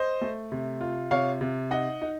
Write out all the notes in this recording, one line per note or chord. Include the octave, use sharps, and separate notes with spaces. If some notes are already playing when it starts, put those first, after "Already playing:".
Already playing: C5 D#5
A3
C3
F4
C3 C#5 F5
C3
D#4 D#5 F#5
D#4